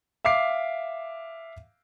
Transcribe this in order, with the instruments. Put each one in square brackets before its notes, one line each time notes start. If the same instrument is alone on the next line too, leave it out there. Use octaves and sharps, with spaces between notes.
[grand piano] E5 F5 D6 C7